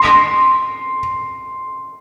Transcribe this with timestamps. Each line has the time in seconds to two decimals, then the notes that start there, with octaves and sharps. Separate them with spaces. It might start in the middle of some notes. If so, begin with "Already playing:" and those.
Already playing: C6